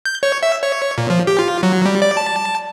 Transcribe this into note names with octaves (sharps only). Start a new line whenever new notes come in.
G6
C#5
E5
C#5
A#2
F3
G4
F4
F#3
G3
D5
A5